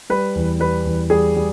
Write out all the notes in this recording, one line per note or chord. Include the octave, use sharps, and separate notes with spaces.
G3 B4
E2
G3 B4
E2
G3 G#4
G3